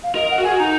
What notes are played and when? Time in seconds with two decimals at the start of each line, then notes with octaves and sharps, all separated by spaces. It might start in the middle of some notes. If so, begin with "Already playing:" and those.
0.03 F5
0.15 A#4 D#5
0.30 F#5
0.38 F#4
0.44 G#4 G#5
0.52 F#4
0.59 D#4 A#5